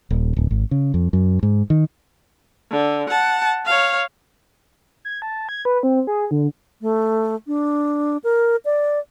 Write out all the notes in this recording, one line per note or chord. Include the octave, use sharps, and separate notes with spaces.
D#1
D1
G#1
C#3
F2
F#2
G#2
D#3
D3
F#5 A5
C#5 F5
G#6
A5
G#6
B4
C4
G#4
D3
A3
D4
A#4
D5